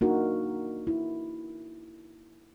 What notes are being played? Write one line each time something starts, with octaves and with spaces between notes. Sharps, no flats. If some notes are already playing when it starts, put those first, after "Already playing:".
A#3 D4 D#4 F#4 A#4
E4